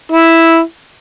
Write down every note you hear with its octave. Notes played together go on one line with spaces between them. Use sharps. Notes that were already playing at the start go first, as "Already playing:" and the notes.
E4